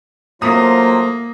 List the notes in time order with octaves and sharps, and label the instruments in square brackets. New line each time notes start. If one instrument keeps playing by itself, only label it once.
[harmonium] F#3 A3 F4 [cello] A#3 [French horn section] C5 [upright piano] D#6